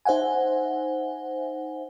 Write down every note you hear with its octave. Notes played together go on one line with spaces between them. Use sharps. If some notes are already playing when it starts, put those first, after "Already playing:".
D#4 C5 E5 F#5 G#5